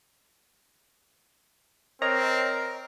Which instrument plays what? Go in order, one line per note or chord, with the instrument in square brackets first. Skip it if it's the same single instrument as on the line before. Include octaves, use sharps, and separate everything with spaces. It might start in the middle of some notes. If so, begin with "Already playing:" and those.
[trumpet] C4 [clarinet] A#4 [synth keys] C#5 D#5 A#5